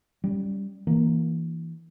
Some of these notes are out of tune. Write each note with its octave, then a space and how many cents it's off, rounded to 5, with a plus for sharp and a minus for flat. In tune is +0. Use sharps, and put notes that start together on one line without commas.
G3 +0 C#4 +0
E3 +0 A#3 +0 D4 +0